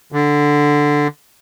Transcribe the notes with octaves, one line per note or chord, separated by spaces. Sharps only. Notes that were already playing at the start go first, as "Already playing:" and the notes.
D3